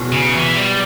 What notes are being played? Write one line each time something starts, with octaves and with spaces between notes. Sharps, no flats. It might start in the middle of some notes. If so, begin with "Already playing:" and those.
Already playing: E2 B2 F#3
C#3
E3
G3